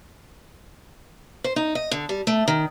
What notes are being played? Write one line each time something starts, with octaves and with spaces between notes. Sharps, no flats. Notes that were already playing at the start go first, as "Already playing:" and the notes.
C5
D#4
D#5
D3
G3
A3
D#3